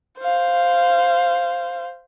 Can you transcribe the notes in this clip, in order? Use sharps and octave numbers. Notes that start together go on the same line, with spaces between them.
C5 F5